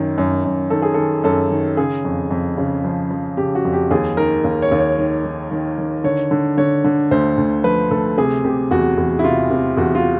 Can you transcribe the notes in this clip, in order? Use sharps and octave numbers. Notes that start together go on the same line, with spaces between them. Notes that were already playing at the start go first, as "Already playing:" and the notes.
Already playing: F#2 D#3
F#2
F#2
D#3 A4
G#4
D#3 A4
F#2 A4
D#3
C#3 G#4
F2
F2
C#3
F3
F3
C#3 G4
F#4
F2
G4
D#2 G#4
D#3 A#4
D#2
C#5
D#2
C#5
D#3
D#3
D#3
D#3
D3 C#5
D3
D3 C#5
D3
D2 C5
D2
F3 B4
D2 A4
C3 G#4
C3 G4
E2 F#4
E2
E4
C3 F4
C3
E2 F#4
F4